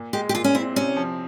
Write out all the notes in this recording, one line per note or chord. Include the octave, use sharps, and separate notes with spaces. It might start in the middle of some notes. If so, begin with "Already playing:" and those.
Already playing: A#2
G#3 G4
G4
A#2 F4
C#4
C4 E4
C3 C#4
F3